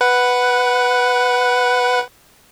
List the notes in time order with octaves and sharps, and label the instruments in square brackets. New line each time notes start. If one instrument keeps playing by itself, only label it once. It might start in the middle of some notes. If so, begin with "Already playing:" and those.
[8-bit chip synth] B4 F#5